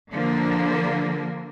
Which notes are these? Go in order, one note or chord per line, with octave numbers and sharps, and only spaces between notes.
D3 F3 A#3